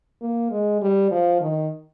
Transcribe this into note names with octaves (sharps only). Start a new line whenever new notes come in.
A#3
G#3
G3
F3
D#3